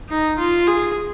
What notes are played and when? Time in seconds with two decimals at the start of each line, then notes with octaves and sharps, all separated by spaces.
0.09 D#4
0.38 F4
0.67 G#4